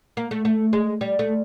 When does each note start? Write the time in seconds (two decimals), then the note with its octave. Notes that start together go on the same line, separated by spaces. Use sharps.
0.17 A#3
0.31 A3
0.45 A3
0.73 G#3
1.01 G3
1.19 A3